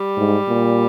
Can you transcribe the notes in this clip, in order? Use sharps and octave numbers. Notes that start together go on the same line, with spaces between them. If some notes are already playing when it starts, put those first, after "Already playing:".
Already playing: G3
G#2
A#2